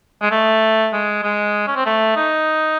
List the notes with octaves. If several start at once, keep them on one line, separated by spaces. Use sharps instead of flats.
G#3
A3
G#3
G#3
C#4
C4
A3
D#4